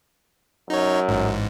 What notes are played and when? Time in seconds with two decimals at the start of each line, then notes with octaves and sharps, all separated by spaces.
0.70 F#2 D#4 C#5
1.08 A1 G#2